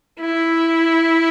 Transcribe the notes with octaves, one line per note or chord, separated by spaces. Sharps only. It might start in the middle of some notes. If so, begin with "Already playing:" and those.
E4